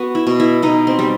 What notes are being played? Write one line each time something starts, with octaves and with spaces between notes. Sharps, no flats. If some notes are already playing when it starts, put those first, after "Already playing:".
Already playing: B3 F#4
E4
B2
E4
B2 D#4
C4
G3